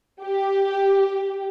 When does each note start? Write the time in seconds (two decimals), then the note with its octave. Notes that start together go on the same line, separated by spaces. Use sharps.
0.21 G4